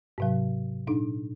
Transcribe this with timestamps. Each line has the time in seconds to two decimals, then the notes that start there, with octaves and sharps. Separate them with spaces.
0.18 G#2 C3 F#3
0.87 A#2 D4 D#4